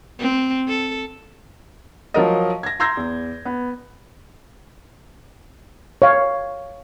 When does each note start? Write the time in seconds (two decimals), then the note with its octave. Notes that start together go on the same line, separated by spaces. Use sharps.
0.19 C4
0.68 A4
2.14 F3 F#3 A#4 D#5
2.63 G#6 A#6
2.80 A#5 C6 E6 G6 G#6 A#6
2.97 E2
3.45 B3
6.02 C#5 F5